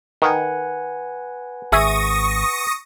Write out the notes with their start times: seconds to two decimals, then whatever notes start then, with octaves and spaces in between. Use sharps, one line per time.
0.22 D#3 B4 F#5 G#5
1.72 G#1 G#4 E5 C#6 D#6 A#6